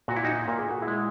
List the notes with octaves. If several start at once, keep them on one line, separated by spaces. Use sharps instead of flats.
A#2 F#4
E4
D#4 F#4
A#2 A#4
G#4
F#4
E4 G#4
G#3